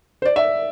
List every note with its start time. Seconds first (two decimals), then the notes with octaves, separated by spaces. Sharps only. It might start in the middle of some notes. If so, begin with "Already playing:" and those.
0.22 C5
0.25 D5
0.36 E5